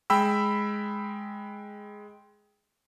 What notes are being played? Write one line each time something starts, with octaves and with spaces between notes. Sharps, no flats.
G#3 G5 B5 E6